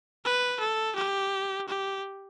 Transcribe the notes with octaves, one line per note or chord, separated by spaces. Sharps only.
B4
A4
G4
G4